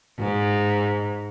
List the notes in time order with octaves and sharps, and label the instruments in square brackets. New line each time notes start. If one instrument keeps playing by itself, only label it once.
[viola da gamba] G#2